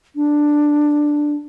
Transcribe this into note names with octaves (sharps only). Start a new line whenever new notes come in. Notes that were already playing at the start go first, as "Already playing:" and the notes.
D4